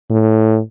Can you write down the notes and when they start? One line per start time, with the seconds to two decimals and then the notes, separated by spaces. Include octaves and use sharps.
0.10 A2